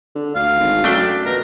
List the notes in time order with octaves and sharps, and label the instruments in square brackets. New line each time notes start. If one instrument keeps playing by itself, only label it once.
[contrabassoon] D3
[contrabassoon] D2 [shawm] F5
[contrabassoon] G#1
[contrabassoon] F#2 [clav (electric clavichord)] A3 D4 G5
[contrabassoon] B2 [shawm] A#4